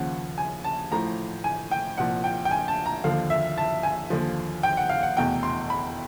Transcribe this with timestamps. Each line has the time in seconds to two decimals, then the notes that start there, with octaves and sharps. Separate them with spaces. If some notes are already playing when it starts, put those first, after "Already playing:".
Already playing: D#2 C#3 F3 F#5
0.38 G#5
0.64 A5
0.91 A1 A2 F3 A#5
1.44 G#5
1.71 G5
1.98 C2 A#2 F3 F#5
2.24 G5
2.45 G5
2.51 G#5
2.68 A5
2.86 A#5
3.04 D#2 D3 F3 F5
3.30 E5
3.58 A5
3.83 G#5
4.10 D#2 D3 F3
4.63 G5
4.77 F#5
4.89 F5
5.03 F#5
5.17 F1 E2 B2 G5
5.43 C6
5.70 B5